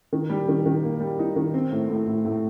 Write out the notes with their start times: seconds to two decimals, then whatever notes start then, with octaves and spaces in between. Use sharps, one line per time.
0.13 D#3
0.30 G3
0.48 D#3
0.66 D#3
0.83 A#3
1.00 G3
1.19 D#4
1.36 D#3
1.54 C4
1.72 A2
1.89 A2
2.06 A2
2.25 A2